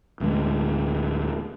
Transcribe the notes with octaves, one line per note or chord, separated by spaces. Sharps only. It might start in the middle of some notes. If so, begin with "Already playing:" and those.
D1 D2 G3 G#3